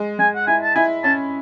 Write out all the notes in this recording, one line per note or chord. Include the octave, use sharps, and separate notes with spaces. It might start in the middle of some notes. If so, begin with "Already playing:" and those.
Already playing: G#3
G#3 G#5
F#5
E4 G#5
A5
E4 G#5
C#4 A5